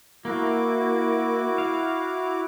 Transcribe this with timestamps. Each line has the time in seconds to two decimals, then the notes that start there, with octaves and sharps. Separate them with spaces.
0.25 A#3 E4 F#4 D6
1.58 F5